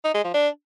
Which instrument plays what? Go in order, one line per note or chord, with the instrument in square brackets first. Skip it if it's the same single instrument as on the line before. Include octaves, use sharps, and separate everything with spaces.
[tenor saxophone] D#4
G#3
F3
D4